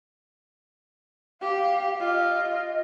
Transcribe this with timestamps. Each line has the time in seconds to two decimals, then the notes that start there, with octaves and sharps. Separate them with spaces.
1.41 G4 F5
2.00 F4 D#5